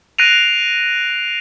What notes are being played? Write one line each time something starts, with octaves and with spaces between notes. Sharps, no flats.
F#6 A#6 C7 D7 D#7 F7